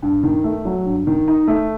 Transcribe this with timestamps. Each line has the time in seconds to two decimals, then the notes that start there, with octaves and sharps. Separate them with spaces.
0.03 G2
0.23 D#3
0.44 A3
0.65 F#3
0.86 G2
1.07 D#3
1.28 D#4
1.48 A3